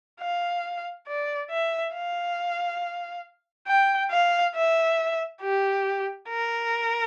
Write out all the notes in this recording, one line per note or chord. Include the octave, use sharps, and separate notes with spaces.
F5
D5
E5
F5
G5
F5
E5
G4
A#4